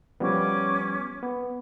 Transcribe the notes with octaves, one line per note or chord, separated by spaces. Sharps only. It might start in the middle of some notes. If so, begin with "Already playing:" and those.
F3 G3 B3 C#4 D6
B3